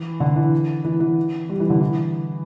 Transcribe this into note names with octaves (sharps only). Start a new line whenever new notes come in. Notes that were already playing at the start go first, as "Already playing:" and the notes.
Already playing: E3
D3
E3
E3
E3
G3
E3
D3
E3